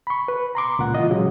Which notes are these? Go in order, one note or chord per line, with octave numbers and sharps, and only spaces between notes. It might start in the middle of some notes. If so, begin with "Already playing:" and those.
B5 C#6
B4
A#5 C6 D6
C#2 A#2 F#5
E3 F4 D#5
A#2 C#3 F#3 G#3